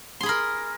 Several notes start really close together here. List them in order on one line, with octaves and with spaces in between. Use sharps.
C6 G#4 B5 A#4